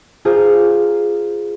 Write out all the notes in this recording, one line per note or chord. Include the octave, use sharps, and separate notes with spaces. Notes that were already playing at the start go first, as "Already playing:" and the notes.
F4 G#4 C5 A#5 F6